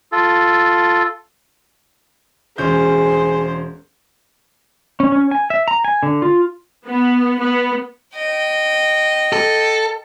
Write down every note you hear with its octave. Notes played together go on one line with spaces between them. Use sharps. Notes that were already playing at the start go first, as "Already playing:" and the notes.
F4 A4
E1 C#4 G#4 C5 G6
C#4
C#4
G#5
E5
A#5
G#5
D3
F4
B3
B3
D#5 G5
A4